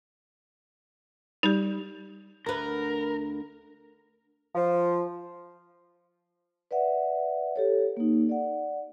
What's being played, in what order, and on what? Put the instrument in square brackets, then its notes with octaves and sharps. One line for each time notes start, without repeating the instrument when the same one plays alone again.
[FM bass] G3 [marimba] D#4 G4
[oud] D2 B4 [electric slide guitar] A#4
[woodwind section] F3
[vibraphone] B4 D5 E5 F#5
G4 A4 C#5
A#3 D#4
D5 F#5